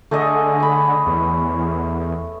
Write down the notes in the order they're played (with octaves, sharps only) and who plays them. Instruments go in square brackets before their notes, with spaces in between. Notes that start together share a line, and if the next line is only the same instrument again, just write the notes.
[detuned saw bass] D3 [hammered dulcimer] A3 G#4 D#5
[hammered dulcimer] C#5 B5
[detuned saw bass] E2